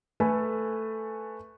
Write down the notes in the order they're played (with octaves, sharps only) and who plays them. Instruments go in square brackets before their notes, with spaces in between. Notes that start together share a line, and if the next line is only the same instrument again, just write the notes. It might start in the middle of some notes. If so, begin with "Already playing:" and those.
[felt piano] A3 A4 B4 G#5